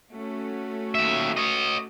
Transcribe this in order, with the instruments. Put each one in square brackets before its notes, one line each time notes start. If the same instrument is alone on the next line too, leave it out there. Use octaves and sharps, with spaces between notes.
[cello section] A3 C#4 F#4
[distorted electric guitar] D#2 E5
C#5 D#5